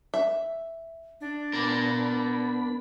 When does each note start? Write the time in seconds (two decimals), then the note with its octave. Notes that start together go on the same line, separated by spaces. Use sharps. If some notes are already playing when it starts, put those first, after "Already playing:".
0.14 E5
1.21 D4
1.53 B3 A#4 D5 B5